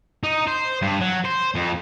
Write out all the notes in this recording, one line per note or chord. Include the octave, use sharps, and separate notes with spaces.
D#4
C5
G2
F#3
C5
F2